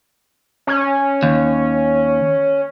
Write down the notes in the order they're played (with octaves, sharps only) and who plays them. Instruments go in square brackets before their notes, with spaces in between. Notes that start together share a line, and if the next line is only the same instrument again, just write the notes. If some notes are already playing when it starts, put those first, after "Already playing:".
[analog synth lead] C#4
[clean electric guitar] D#2